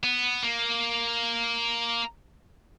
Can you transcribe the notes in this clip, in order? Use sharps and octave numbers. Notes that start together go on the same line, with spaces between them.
B3
A#3